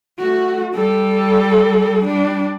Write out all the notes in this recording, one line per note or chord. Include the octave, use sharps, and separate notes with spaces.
A3 F#4
G3 A4
G3 D4